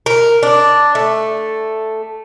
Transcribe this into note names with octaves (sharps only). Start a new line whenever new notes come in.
A#4
D4
A3